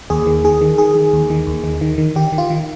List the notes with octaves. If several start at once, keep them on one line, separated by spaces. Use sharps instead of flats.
D#2 G#4
D#3
D#3 G#4
D#3
D#3 G#4
D#3
D#2
D#3
D#2
D#3
D#3
D#3
D#3 G4
D#3
F4
D#3